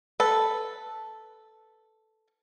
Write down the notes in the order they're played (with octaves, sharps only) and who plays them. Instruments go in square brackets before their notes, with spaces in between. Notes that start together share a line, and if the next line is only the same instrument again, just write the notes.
[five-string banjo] A4 B4